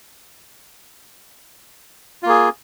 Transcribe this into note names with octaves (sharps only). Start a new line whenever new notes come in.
A#3 F4 G#4